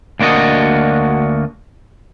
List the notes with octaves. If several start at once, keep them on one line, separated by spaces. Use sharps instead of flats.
D2 A#3 D4 F#4 D#5